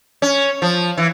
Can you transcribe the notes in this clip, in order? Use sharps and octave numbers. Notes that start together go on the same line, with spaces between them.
C#4
F3
E3